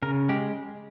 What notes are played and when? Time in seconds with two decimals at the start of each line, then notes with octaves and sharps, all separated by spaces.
0.02 C#3 A#4
0.29 G#3 G4